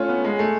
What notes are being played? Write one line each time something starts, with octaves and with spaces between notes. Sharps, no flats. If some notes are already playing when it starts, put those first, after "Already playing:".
Already playing: A3 C#4 F4
B3
G#3
A3